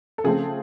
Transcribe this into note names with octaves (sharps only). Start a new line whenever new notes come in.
A4
C#3 F3 A3 C4 G#4